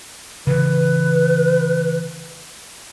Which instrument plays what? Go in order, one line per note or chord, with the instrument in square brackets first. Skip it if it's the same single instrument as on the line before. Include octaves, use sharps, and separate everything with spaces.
[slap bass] C#3 E3 [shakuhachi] B4